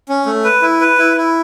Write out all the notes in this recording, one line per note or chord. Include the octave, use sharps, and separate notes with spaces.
C#4
A3
B4
E4
B4
E4
E4